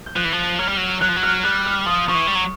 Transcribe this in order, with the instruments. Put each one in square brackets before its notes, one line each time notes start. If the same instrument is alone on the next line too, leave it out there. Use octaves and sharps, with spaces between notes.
[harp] G6
[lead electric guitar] F3 [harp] F#6
[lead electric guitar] E3
F3
[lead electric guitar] F#3 [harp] F6
[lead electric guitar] G3
F#3
[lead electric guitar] F#3 [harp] F#6
[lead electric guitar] F3
F#3
[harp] F6
[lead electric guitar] G3 [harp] F#6
[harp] F6
[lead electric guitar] F3 [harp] D#6
[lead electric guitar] F3 [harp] C#6
[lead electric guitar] E3
G3
F#3